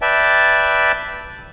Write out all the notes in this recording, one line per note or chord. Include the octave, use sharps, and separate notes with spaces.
B4 D5 E5 G5 A5